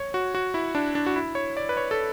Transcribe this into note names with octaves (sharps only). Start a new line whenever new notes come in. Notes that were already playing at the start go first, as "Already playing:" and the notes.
Already playing: C#5
F#4
F#4
E4
D4
D4
F#4
E4
C#5
D5
B4
C#5
A4